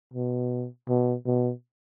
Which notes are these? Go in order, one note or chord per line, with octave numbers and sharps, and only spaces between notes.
B2
B2
B2